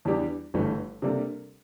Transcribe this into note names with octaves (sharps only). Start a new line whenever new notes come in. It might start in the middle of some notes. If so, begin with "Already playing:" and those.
E2 E3 G3 D4 G4
G1 G2 E3 A3
C3 G3 A#3 D4 A4